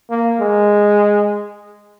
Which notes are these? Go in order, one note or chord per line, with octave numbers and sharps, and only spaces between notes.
A#3
G#3